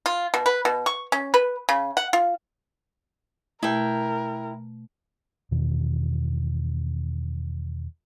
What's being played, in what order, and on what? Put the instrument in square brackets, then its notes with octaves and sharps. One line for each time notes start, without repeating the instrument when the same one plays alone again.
[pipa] F4
B2
B4
B2
C#6
C#4
B4
C#3
F#5
F4
[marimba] B2 A3 [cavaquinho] E4 G5 [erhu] A#4
[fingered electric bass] E2 B2 D#3